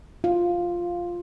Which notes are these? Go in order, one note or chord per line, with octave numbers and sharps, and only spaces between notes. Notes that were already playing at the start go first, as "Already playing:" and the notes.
F4